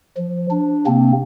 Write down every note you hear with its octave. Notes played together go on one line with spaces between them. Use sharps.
F3
D4
C3 A#3 C4